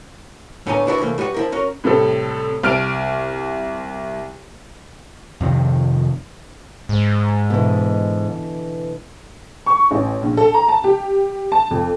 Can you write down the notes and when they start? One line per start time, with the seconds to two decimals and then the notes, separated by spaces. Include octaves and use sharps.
0.67 A2 D3 B3 C#5 G#5 A#5
0.87 D4 E4 F#4 B4 C#5 D5
0.98 C2 E3 F#3 A3 A#3
1.18 G3 F#4 B4 C#5 F#5
1.34 F3 E4 A#4
1.52 C#4 F#4 A#4
1.84 A2 C3 G3 A4
2.63 C2 F6 D7
5.41 F2 C3 D#3
6.89 G#2
7.50 B2 D3 E3
9.66 C#6
9.91 A1
10.22 A#1
10.37 A4
10.54 A#5
10.68 A5
10.84 G4
11.52 A5
11.71 F2